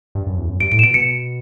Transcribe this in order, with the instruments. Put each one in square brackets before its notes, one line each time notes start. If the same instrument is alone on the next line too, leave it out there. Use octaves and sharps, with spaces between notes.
[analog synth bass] G2
F#2
E2
F#2
[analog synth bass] G2 [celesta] D7
[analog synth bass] A2 [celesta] D7
[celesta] E7
[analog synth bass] B2 [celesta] D7
[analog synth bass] B2 [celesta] C#7